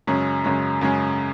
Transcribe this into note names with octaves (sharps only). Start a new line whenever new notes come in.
F#2 C#3 G#3 C#4
F#2 C#3 G#3 C#4
F#2 C#3 G#3 C#4